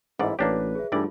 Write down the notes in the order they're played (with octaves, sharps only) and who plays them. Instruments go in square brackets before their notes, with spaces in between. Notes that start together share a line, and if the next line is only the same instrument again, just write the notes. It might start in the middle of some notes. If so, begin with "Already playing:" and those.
[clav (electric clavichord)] A1 G#2 D5 [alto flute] E4
[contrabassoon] A1 [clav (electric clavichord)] A#3 D4 G4 [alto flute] B4 [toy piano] C#5
[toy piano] G#4 E5
[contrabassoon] G2 [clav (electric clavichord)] E3 G3 D5 [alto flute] A3 [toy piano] D#4 F4